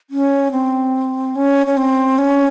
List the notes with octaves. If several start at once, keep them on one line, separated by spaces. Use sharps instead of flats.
C#4
C4
C#4
C#4
C4
C#4